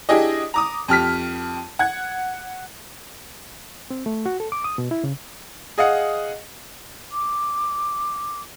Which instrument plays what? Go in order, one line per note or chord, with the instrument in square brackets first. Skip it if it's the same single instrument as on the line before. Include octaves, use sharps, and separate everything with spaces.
[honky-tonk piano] D4 E4 G4 G#4 D#5
A#5 D6 D#6
F2 G4 F6 B6
F#5 G#6
[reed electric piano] C4
A3
F#4
A4
D6
D#6
B2
E4
C#3
[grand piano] G#4 D#5 F5 F#5
[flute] D6